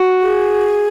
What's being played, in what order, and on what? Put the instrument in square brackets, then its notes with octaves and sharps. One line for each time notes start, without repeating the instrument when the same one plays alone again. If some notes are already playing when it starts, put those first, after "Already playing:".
Already playing: [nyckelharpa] F#4
[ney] G#4